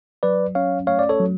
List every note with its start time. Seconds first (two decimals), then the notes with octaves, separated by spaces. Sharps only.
0.23 F#3 B4 D5
0.55 C#4 C#5 F5
0.87 A3 C#5 F5
0.99 D5
1.09 A4 C#5
1.20 F#3